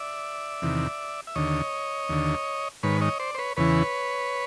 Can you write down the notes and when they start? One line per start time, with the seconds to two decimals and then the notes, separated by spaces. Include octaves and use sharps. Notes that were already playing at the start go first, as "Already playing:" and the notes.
Already playing: D5 E5
0.62 E2 C3 D#3
1.27 E5
1.35 D#2 D3 C#5 D#5
2.09 D#2 D3
2.83 G#2 D#3 B4 C#5
3.01 C#5 D#5
3.20 C5 D5
3.35 C5
3.38 B4 C#5
3.57 E2 C#3 E3 B4 C#5